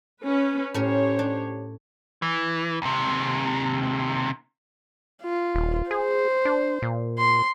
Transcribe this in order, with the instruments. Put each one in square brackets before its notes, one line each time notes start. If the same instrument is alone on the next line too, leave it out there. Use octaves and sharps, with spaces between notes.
[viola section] C#4 B4
[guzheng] A2 C#4 A#4 [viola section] G4 C5 C#5
[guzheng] D4
[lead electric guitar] E3
D#2 C3
[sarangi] F4
[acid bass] D#1
[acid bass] G#4 [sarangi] C5
[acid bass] D4
A#2
[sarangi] C6